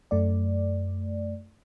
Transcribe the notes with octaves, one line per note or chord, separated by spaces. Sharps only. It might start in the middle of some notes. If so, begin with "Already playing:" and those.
F#2 A3 D5